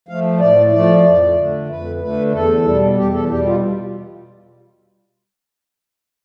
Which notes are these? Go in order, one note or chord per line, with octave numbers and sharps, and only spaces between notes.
F3 A3 F5
A2 D5
F3 A3 D5
F2
D3 A3
F2 B4
D3 A3 B4
E2 A4
B2 G3
E2 G4
A4
B2 G3 G4
F4